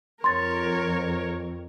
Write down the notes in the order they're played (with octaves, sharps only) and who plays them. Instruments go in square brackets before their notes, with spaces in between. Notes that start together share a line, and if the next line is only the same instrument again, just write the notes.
[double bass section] F2 [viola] A#4 C#5 [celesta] C6 A6